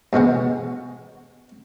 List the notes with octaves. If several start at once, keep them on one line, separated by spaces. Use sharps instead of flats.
G2 B2 G#3 B3